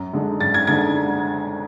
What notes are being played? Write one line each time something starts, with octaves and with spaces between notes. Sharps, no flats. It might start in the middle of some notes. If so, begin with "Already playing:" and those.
Already playing: F#2
D3 G#3 D4
F#2 A6
G#6
D3 G#3 D4 G#6